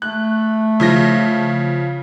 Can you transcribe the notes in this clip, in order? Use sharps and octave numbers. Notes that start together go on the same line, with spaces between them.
A3 F#6
C#3 F3 A#6